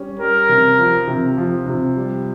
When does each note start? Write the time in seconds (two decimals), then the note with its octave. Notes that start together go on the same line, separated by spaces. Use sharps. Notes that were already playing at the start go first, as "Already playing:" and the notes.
Already playing: G3 C#4
0.19 G3 A#4
0.49 C3
0.78 F3
1.07 C3
1.37 F3
1.66 C3
1.96 G3